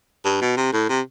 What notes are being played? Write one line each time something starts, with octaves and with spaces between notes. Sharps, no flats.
G2
B2
C3
A2
C3